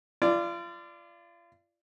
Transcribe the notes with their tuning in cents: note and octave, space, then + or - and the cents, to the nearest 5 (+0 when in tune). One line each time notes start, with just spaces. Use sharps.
F4 -35 D5 +0